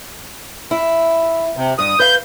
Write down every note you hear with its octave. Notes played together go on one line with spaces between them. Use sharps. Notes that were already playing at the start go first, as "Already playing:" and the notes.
E4
C3
G2 D#6
B4 F5 G6